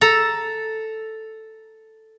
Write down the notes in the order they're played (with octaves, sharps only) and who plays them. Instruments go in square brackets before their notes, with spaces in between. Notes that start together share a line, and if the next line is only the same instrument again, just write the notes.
[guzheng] A4 A#5